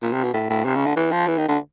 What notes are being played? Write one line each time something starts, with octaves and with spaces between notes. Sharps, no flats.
A#2
C3
B2
A2
A2
C3
C#3
D3
E3
F3
E3
D#3
D3